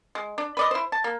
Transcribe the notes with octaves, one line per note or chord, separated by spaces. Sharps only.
G#3
D4
B4 D5 D#5
E4 C5
A5
A#3